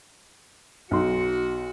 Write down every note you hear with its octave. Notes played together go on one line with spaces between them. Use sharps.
B1 D#4 F#4 C6